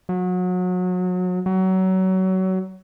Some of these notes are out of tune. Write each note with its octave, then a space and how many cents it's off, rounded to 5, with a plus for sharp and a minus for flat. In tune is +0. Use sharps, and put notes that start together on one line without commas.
F#3 -30
F#3 +25